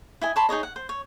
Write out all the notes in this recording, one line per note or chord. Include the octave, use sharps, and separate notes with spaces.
E4 D#5 G#5
C#5 A5 B5 C6
D#4 G#4 C#5 D#5
F#5
C5
C#5